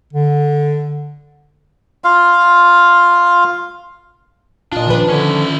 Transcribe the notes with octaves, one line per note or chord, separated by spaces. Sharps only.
D3
F4 F5
A#2 D4 F4 D#5 A5
D#3 F3 B4
D3 C#4 E4